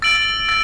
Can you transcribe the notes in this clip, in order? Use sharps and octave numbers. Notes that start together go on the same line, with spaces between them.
E6 A6 D7 F#7
E6 A6